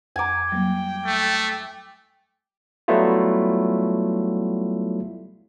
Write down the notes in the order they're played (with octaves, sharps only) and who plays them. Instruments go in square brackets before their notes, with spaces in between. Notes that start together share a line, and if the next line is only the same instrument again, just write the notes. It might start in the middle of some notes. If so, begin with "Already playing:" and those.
[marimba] F2 F#5 A#5 [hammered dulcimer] G#5 D6
[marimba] F#3 G3 A#3 [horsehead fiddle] G5
[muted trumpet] A3
[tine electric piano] F#3 G3 A3 B3 E4 F4